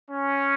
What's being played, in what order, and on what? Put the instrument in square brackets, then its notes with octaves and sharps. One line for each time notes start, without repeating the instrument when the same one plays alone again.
[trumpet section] C#4